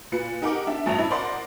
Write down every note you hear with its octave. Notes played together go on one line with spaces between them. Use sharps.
A#2 B4 C#7
D#4 G4 A#4 F#5 G5 D6
D4 E5
A1 G2 C#4 E5 F7
E4 B5
A#4 C5 D5 D#5 F#5 C6